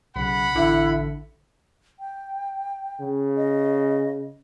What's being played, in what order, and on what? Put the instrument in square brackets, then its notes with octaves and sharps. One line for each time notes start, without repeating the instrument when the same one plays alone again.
[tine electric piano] B1 C#3 [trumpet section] F#5 B5
[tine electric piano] A1 D3 C#7 [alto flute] E4
[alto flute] G5
[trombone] C#3
[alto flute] D#5